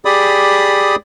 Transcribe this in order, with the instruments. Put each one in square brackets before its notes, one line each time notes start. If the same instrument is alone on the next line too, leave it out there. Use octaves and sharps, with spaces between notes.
[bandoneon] G4 G#4 D5 B5 D#6